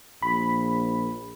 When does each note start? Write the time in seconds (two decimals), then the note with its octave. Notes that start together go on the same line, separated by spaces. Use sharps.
0.23 A#1 B5